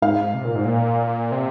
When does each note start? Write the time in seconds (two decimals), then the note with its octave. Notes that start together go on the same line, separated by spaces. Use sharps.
0.02 G#2 F5
0.34 C3
0.45 A#2
0.55 G#2
0.65 A#2
1.32 C3